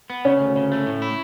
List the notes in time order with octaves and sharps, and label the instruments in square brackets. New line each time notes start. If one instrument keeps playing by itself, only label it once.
[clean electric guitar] B3
[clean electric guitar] C#3 [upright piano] C#4
[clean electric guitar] D2
C#3
A3
A2
E4